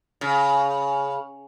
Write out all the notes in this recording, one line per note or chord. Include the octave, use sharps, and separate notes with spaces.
C#3